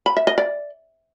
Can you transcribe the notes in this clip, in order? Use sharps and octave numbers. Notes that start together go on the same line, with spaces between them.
B5
E5
D#5
D5